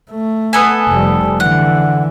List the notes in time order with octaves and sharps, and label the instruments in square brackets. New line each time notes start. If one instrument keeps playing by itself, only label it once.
[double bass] A3
[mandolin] B3 A4 G#5
[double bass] F1 G3
[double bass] D3 E3 [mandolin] F#5